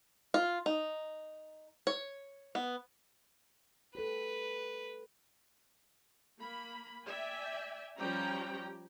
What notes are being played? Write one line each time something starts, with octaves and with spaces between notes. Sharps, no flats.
F4
D#4
C#5
B3
G4 A4 B4
A#3 B5
D5 E5 G5 G#5
F3 G3 C#4 G4 G5 A#5